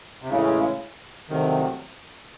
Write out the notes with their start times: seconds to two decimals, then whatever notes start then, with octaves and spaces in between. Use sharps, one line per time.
0.22 C3
0.29 A1 A2 C#3 G#3 C#4 E4
1.30 C2 C3 D#3 F#3 A3 C4